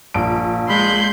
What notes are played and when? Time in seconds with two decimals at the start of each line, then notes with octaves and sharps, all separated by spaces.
0.14 A#1 D7
0.69 G#3 B5 C6 G6